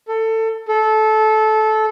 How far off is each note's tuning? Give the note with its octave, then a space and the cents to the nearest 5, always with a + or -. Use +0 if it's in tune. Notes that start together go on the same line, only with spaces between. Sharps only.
A4 +20
A4 -20